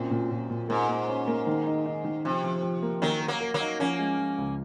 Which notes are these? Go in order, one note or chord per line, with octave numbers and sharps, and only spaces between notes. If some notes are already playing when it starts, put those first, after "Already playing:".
Already playing: F#2 A#2 C4
A#2
A#2
A#2
G#2 A#3
A#3
C#4
A#3
D#3
D#4
D#4
D#3
C3 F3
F3
F3
A#3
D#3 F#3 A#3
A#4
F#3 A#3
A#4
F#3 A#3
D#4
F3 A#3 C#4
G#3
F3
C#2